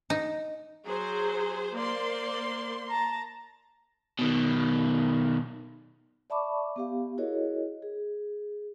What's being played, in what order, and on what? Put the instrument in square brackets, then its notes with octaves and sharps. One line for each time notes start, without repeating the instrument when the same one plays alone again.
[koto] D#4
[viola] F#3 [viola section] G#4 C5
[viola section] A#3 C6 [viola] C5 D5
[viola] A5 A#5
[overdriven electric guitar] B2 D#3
[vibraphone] D5 E5 A5 B5 C#6 D6
B3 G4 F5
E4 F#4 G#4 A#4 C#5 D#5
G#4